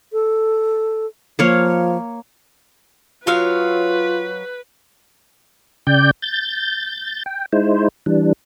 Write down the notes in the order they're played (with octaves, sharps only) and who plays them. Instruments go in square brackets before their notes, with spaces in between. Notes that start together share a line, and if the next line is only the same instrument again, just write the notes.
[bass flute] A4
[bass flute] F3 [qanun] A#3 C#5 F5
[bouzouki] F#3 C#5 F5 [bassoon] F4 [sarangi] B4
[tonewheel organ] C#3 D5 G5 G6
G6 A6
G5
G#3 D#4 E4 C5
E3 G3 D4